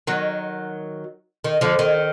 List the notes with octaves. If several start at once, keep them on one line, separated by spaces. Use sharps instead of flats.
D#3 F#3
D#3
D3 F3
D#3